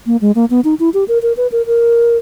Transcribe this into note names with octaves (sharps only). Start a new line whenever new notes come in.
A#3
G#3
A#3
B3
D#4
E4
G4
A#4
A#4
B4
A#4
A#4